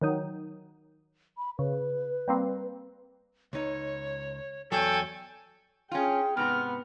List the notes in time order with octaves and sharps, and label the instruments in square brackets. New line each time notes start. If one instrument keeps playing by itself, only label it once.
[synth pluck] D#3 F#3 D#4
[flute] B5
[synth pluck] C#3 [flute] B4
[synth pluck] G3 A#3 C4
[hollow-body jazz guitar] C#2 D#4 [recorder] C#5
[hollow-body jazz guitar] E2 F#3 [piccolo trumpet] A4 [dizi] G5 [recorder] G#5
[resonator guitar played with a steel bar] C#4 F4 [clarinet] G#4 [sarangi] G5
[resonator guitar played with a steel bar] G#2 C3 A#5 [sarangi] B3 [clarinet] F6